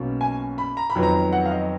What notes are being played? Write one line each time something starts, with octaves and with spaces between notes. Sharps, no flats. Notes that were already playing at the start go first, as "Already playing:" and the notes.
Already playing: B1 B2 A#3 C#4
G#5
B5
A#5
B5
F2 D#3 F#3 B3
A#5
F#5
F5
D#5